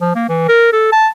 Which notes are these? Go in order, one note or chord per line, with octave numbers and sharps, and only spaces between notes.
F3
A#3
E3
A#4
A4
A5